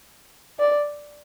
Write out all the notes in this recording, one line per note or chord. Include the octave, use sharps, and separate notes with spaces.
D5